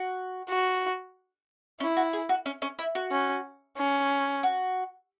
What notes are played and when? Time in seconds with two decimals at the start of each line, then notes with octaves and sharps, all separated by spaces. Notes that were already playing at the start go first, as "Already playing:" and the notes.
Already playing: F#4
0.49 F#4
1.80 C#4 E4
1.97 F#4
2.13 G#4
2.29 F#4
2.46 C#4
2.62 C#4
2.79 E4
2.95 F#4
3.11 C#4
3.77 C#4
4.43 F#4